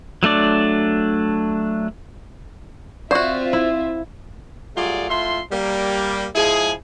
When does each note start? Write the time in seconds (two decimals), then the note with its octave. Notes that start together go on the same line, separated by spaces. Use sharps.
0.23 F#3 A3 D4 D5
3.11 C4 F4 F#4 C5 D5 E5 F5 C#6
3.53 E4
4.77 F#3 G3 A3 F4 G#4 D5
5.10 A2 F4 E5 C6
5.52 G3 A#3
6.35 F3 G#3 E4 G#4